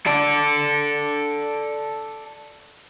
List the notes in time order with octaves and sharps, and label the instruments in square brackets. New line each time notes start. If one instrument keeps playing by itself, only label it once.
[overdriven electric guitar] A4 D5